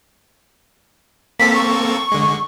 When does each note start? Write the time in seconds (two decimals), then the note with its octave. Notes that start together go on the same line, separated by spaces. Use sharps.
1.40 A#3 C4 A4 B6
1.55 C#6
2.12 D3 G#3